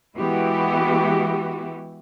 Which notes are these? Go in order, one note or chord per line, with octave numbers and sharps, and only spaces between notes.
E3 G#3 B3 E4 F#4 G4